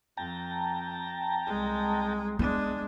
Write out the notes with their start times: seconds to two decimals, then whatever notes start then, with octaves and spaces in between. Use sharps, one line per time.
0.17 F2 G5 A5 A#5
1.46 C2 G#3
2.39 G#3 B3 D4